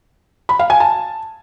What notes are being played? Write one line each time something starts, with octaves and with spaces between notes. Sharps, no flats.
B5
F5
G#5
A5